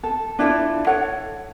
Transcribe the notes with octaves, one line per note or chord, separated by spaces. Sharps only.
A4
D4 E4 F4 A4
A4 C#5 F#5